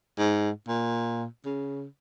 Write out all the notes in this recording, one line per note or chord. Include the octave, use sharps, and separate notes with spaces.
G#2
A#2
C#3